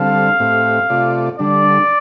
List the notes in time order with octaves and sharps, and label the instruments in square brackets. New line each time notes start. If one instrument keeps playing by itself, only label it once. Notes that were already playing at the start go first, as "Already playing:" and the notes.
Already playing: [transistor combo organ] D3 G3 C4 A4 [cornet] F5
[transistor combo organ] A2 A3 C4 G4
C3 A3 F4 D5
[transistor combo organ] D3 G3 D4 [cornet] D5